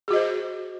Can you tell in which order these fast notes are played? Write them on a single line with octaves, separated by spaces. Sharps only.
G#4 F#4 D#5 C5